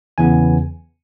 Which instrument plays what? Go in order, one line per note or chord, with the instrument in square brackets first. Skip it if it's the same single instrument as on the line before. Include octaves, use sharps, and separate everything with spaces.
[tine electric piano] E2 C#3 E3 B3 G#5